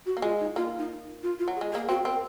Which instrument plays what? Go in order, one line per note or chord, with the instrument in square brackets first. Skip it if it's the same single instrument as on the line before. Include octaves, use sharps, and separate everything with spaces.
[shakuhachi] F#4
[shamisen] A#3
[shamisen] G#3 [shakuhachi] F4
[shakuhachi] D#4
[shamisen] A#3 [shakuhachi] F4
[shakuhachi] D#4
F4
F4
[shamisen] F#3
[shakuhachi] G#4
[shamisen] G#3
[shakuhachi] G#4
[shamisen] A#3
[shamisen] C4 [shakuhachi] F#4
[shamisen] C4 [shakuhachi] A#4